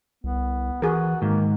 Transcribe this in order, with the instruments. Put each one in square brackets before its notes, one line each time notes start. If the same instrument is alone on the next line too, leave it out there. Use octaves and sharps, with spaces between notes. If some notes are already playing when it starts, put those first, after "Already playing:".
[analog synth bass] C2 [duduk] B3
[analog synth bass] E3 [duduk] F#4 [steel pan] G#4 A#4
[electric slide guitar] G#2 [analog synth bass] D#3 [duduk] A#3